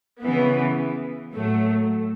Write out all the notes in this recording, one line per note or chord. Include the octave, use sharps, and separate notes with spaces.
C#3 E3 B3
A2 F#3 A3